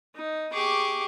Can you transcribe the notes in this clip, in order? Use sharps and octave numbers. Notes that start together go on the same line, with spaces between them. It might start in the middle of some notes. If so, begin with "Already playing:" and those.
D#4
G4 G#4 C#6 D6